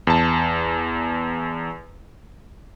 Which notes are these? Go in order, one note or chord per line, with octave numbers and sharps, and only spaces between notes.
E2 A5